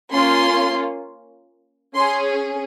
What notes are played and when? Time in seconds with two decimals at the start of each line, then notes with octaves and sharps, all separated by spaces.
0.12 A#3 C#4 F4 C6
1.94 C#4 G#4 C6